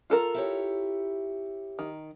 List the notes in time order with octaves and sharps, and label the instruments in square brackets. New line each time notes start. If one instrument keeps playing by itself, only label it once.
[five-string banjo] F4 A4 A#4
[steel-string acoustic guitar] E4 G4 C#5
[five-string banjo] D#3